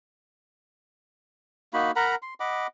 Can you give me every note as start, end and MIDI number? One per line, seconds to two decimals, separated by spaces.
1.74 1.91 58
1.74 1.91 63
1.74 1.91 66
1.74 1.91 83
1.96 2.15 70
1.96 2.15 78
1.96 2.15 82
1.96 2.15 83
2.22 2.34 84
2.40 2.67 75
2.40 2.67 78
2.40 2.67 83
2.40 2.67 86